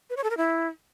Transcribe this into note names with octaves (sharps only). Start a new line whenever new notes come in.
B4
C#5
A4
A#4
E4